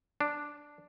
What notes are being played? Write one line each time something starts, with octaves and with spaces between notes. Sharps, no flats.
D4